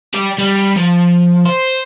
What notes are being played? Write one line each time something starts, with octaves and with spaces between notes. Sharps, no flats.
G4 D5
G3
F3
C5